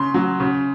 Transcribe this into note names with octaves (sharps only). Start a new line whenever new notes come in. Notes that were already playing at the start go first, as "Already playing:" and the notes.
Already playing: C#3 C6
F#3
C#3